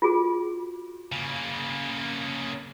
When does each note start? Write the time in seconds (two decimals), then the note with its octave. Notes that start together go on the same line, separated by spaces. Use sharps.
0.02 F4 F#4 G#4
1.12 C#3 A#3